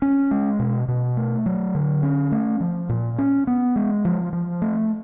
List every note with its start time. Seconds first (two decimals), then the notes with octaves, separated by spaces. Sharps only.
0.02 C#4
0.31 G#3
0.59 B2
0.88 B2
1.17 A3
1.46 F#3
1.75 D3
2.03 C#4
2.32 A3
2.60 F3
2.89 A#2
3.18 C#4
3.47 B3
3.76 G#3
4.05 F3
4.33 F3
4.62 A3